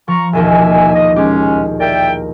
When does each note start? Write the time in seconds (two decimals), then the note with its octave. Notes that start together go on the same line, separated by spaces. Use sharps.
0.08 F3 A#5 C#6
0.33 E1 A#1 D#2 B2 E5 G#5
0.94 D#5
1.16 G#3 C#4 G4 G#4
1.80 A#4 D5 E5 G5